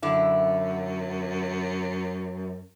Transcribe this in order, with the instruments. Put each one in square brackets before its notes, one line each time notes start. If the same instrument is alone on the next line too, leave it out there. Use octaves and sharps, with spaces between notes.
[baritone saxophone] F#2 [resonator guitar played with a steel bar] D3 E4